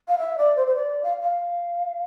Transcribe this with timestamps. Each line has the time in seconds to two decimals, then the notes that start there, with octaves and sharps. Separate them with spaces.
0.08 F5
0.19 E5
0.38 D5
0.56 C5
0.67 C5
0.75 D5
1.03 F5
1.23 F5